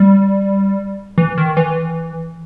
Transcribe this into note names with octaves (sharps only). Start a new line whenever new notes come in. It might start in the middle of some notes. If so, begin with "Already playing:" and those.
Already playing: G3
E3
D#3
E3